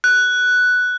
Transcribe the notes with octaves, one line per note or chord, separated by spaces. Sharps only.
F#6